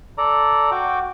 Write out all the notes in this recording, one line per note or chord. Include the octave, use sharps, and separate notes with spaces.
A4 D5 A#5
F#4 G5 D6